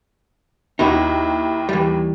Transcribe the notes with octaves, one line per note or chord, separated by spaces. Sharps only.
D#2 D#4 E4 F#4
E3 G3